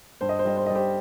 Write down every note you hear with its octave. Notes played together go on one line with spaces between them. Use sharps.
G2 C5
D#5
C5
G3 D#5
C5
G3 D#5
G4 C5